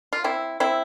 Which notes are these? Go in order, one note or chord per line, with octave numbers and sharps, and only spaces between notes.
F4
C4 E4
C4 E4